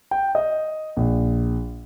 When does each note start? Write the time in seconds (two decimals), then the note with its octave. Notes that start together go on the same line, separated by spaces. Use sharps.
0.11 G5
0.35 D#5
0.97 A#1